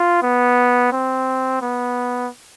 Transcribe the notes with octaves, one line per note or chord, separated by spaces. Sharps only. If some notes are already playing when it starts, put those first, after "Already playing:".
Already playing: F4
B3
C4
B3